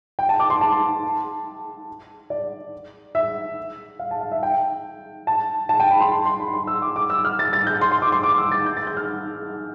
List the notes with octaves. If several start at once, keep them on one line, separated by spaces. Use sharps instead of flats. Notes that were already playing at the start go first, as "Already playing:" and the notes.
G5
A5
D6
C6
A5
D5
E5
F5
A5
F5
E5
G5
A5
A5
G5
B5
C6
C6
C6
B5
C6
E6
D6
D6
E6
F6
A6
A6
G6
C6
C6
D6
C6
D6
E6
A6
G6
A6
G6
F6